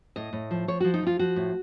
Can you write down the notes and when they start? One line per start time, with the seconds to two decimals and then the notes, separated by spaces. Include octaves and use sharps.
0.16 A2 D#5
0.33 A2
0.51 F3
0.68 F3 C#5
0.80 F3 F#4
0.94 D#4
1.03 F3 F4
1.19 F3 F#4
1.36 A2